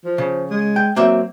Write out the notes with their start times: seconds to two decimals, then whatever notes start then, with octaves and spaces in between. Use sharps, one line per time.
0.05 F3
0.18 C#3
0.50 G#3
0.76 G5
0.96 F#3 A#3 C4 E5